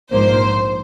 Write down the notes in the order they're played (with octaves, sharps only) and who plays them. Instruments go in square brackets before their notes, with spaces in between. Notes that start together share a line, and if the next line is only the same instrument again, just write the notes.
[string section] A#1 G#2 F3 A#3 C5